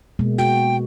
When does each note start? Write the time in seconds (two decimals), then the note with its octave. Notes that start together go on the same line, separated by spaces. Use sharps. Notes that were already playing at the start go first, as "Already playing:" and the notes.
0.19 B2 G#3 A#3
0.38 F#4 G5